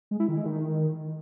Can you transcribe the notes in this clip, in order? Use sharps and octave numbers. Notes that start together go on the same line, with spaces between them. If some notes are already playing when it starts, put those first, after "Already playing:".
G#3
E4
D#3
G#3
D#3